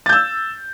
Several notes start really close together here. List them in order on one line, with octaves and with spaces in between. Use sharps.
A6 G6 E6